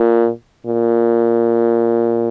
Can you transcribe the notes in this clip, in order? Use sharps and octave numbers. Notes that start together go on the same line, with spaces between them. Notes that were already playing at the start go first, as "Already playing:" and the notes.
Already playing: A#2
A#2